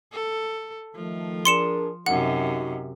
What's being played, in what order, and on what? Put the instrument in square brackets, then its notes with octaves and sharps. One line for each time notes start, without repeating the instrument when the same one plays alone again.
[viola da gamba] A4
[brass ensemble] D#3 A3 [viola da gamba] F3
[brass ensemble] D4 G#4 A#4 [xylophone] C6 C#7 E7
[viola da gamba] F#2 C3 [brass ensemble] D#4 F#4 [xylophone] F#5